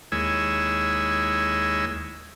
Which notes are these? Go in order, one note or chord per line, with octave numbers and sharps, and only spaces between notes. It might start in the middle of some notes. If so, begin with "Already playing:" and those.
D#2 G#3 E4 C#5 G#5 E6